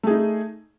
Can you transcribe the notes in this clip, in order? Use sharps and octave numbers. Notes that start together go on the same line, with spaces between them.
A3 D#4 G#4